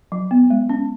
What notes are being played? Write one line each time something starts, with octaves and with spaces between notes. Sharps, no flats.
F#3
B3
G#3
C#4